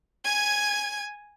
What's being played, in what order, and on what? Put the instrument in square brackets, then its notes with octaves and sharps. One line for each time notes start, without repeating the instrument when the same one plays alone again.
[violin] G#5 G#6